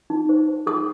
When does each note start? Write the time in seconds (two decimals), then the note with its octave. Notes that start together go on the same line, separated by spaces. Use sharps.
0.10 D#4
0.29 C5
0.48 C5
0.67 G#4 D#6